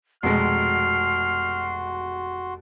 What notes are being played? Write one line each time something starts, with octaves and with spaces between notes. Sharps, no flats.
F1 B2 G#3 F#4 C6 F6 C7